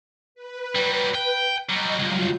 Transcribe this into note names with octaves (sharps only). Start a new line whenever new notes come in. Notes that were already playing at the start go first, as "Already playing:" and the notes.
B4
F#3 G3
G5
F#3 G3 D#5 A#5
C#2 G2 F#3 F4 G6